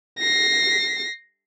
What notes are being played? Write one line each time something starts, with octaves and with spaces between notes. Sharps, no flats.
A#6 C7